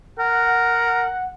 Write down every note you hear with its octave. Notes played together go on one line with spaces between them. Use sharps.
A#4 F#5